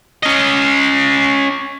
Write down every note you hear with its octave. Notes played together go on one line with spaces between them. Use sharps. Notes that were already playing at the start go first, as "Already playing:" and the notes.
C#4 D#5